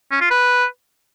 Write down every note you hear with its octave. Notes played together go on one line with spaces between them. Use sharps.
C#4
F4
B4